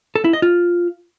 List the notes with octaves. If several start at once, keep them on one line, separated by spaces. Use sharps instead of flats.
A4
E4
D#5
F4